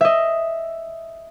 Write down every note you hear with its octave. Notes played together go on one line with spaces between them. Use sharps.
D#5 E5